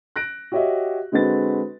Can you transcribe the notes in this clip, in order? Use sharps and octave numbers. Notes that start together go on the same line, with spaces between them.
F#6 A#6 D7
F#4 G4 C#5 D#5 E5
D3 G#3 C4 F#4 B4 A6